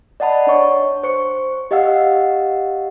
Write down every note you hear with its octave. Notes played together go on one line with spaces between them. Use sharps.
D5 D#5 F#5 A5 B5
D4 C#5 C#6
C5 C#6 C#7
G4 D#5 F5 F#5 E6